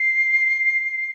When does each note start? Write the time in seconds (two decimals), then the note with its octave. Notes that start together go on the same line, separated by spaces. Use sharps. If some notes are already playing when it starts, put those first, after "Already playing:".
Already playing: C7